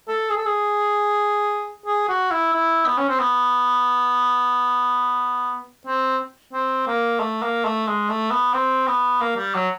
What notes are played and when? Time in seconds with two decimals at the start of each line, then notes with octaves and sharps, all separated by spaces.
0.08 A4
0.30 G#4
0.37 A4
0.46 G#4
1.86 G#4
2.09 F#4
2.31 E4
2.53 E4
2.86 B3
2.97 C#4
3.09 C4
3.19 B3
5.87 C4
6.53 C4
6.87 A#3
7.20 A3
7.42 A#3
7.65 A3
7.87 G#3
8.09 A3
8.31 B3
8.54 C4
8.87 B3
9.21 A#3
9.37 G3
9.54 F#3